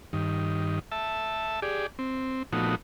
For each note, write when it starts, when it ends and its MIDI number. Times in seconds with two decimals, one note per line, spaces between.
0.13 0.79 43
0.13 0.79 51
0.92 1.60 76
0.92 1.60 81
1.62 1.87 67
1.62 1.87 68
1.62 1.87 74
1.99 2.43 60
2.53 2.75 46
2.53 2.75 53
2.53 2.75 57
2.53 2.75 59
2.53 2.75 63
2.53 2.75 66